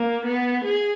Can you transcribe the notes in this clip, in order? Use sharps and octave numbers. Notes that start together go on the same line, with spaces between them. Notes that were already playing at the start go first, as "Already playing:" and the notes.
Already playing: A#3
B3
G#4